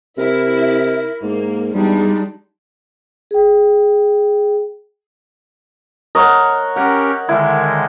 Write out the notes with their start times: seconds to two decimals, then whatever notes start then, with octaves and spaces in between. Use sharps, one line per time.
0.18 C3 E4 A#4
1.22 G#2 A#3
1.75 E2 G3 G#3 D4 D#4
3.31 G#4 G5
6.15 A#4 C#5 D#5 F#5
6.76 C#4 G4 A#4 F#5
7.29 D3 D#3 G#3 E4